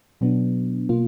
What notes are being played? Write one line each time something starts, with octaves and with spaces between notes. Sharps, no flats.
B2 F#3 B3 D4
B2 A#3 F4